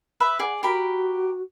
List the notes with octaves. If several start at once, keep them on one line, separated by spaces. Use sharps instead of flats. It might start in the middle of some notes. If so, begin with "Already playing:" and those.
B4 E5 B5
G#4 D5 F#5
F#4 G4 A#4 B5